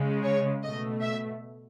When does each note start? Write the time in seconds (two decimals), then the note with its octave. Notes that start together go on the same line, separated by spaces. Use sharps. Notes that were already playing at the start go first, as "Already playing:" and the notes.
Already playing: C#3 G#3
0.24 C#5
0.63 B2 A3 D#5
1.02 E5